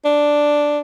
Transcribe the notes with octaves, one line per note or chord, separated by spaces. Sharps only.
D4